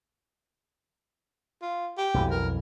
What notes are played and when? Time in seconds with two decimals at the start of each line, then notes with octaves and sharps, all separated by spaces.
1.62 F4
1.98 G4
2.14 B1 F2 E3
2.31 A#4